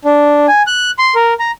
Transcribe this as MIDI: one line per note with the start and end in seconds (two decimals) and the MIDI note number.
0.05 0.46 62
0.48 0.62 80
0.67 0.91 90
0.99 1.14 84
1.15 1.34 70
1.40 1.51 82